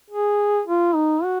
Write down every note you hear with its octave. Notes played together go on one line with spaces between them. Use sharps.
G#4
F4
D#4
F#4